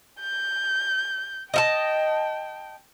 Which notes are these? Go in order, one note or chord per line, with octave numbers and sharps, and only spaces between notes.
G6
D#5 E5 G5 A5